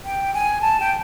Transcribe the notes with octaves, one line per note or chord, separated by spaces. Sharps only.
G5
G#5
A5
G5